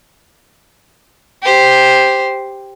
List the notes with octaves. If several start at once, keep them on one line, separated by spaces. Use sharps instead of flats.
G4 C5